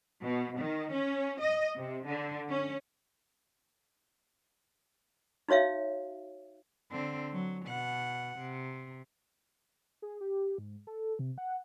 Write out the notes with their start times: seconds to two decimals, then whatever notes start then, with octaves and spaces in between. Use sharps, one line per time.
0.22 B2
0.57 D#3
0.91 C#4
1.40 D#5
1.76 C3
2.06 D3
2.48 C#4
5.48 D#4 F#4 C#5 E5 F5
6.91 D3 C4
7.33 F#3
7.66 B2 F#5
8.38 C3
10.02 G#4
10.21 G4
10.58 G#2
10.87 A4
11.19 C3
11.38 F#5